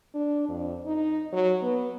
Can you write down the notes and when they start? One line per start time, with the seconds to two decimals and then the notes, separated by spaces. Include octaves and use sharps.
0.14 D4
0.48 F2
0.86 D#4
1.32 F#3
1.62 B3